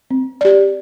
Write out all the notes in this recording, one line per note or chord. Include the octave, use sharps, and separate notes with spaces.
C4
G4 D5